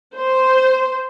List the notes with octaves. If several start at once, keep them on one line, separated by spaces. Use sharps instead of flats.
C5